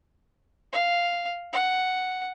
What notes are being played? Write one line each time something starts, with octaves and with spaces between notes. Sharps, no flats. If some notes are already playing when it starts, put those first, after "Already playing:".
F5
F#5